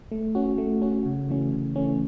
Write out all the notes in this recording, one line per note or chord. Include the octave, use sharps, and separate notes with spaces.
A3
C#4 F#4
A3
C#4 F#4
C#3
E3 A3 C#4
C#3
E3 A3 C#4